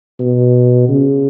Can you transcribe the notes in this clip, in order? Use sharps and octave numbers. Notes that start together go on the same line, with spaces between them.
B2
C#3